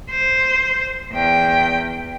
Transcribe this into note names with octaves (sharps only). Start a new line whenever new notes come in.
C5
E2 G5